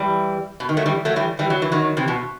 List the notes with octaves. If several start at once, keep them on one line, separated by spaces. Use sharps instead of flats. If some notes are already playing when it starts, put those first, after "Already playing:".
Already playing: E3 G3
B2
D#3
F#3 A3
E3 G3
F#3 A3
E3 G3
E3 G3
F#3
E3
D#3 F#3
C3 E3
B2